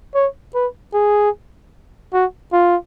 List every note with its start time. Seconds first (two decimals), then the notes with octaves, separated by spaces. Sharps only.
0.15 C#5
0.55 B4
0.94 G#4
2.13 F#4
2.52 F4